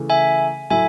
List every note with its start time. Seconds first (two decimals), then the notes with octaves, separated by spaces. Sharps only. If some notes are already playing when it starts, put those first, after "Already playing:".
Already playing: C#3 E3 A3
0.10 E5 G#5
0.70 A2 F#3 A3 E4 E5 G#5